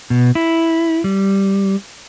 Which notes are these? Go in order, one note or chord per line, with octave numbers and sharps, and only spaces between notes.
B2
E4
G3